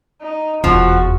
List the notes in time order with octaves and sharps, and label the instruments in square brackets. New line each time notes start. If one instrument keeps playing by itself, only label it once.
[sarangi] D#4
[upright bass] F1 [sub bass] E2 [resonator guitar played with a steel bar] F3 [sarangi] F#4